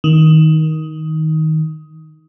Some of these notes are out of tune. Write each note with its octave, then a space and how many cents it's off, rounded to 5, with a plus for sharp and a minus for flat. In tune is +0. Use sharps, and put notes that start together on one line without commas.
D#3 +15